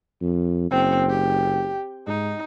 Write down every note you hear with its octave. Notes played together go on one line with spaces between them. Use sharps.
F2
F#1 C4
G4
G#2 D#4